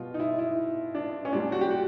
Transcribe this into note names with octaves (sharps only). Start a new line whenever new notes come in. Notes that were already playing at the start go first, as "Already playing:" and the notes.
Already playing: B2 G3 F4
D#4
E4
E4
D4
C#4
A#2 G3 D4
F#4
G4
F#4